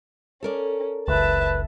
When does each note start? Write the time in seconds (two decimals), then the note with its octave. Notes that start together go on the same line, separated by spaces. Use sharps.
0.43 C#4 A4 A#4 D5
1.08 F#1 C#2 B4 E5 A5